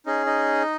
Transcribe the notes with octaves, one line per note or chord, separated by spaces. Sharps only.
C#4 D#4 G#4 D#5
D#4 D#5